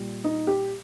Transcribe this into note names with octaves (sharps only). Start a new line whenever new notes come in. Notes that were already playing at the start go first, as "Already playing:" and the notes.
Already playing: A#2 G3
D#4
G4